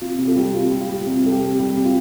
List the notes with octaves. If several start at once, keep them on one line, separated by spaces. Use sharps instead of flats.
C3 F4
C3
F4 A4
G3
C3 F4 A4
G3
F4
G3
C3
G3 A4
G4
C3
G3 G4
C3
F4